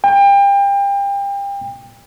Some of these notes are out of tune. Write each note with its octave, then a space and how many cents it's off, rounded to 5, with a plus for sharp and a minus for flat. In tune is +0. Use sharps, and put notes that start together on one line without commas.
G5 +30